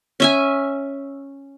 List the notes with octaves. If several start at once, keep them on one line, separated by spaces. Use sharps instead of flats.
C#4 E5 G#5